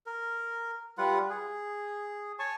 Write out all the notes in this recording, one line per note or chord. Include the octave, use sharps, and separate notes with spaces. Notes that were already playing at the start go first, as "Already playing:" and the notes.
A#4
G3 F4 B4 F#5
G#4
C#5 G#5 A5 C#6